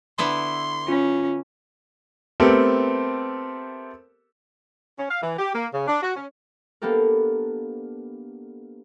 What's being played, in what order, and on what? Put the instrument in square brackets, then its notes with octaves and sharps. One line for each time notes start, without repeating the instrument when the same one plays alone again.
[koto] D3 B3 E4 [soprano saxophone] C6
[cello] C#4 [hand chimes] F4
[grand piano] A3 B3 C4 G4 A4 A#4
[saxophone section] C#4
F5
E3
G4
A#3
C#3
D4
F#4
C#4
[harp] A#3 B3 D4 G4 A4 A#4